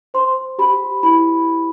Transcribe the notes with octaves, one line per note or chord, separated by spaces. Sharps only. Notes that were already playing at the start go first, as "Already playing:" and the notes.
C5 C6
G4 B5
E4 B5